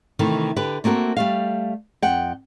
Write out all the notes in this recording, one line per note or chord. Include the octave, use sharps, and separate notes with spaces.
C3 D#3 E3 A3
D3 G4 B4
A3 A#3 C4 F#4 A#4
G3 A3 F5
F2 F#5 G5